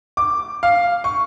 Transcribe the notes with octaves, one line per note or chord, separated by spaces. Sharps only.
D6
F5
C#6